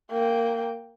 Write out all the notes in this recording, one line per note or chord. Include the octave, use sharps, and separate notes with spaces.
A#3 G5